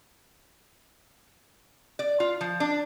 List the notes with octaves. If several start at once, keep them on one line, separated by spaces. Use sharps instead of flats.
D5
F4
F3
D4